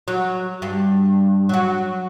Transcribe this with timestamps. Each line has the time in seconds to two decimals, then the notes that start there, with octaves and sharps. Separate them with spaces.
0.08 F#3
0.62 G2
1.49 F#3 F#4